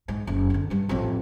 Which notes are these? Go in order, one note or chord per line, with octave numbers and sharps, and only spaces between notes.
G#2
F#1
F2 D3
G2 G3
A1 F2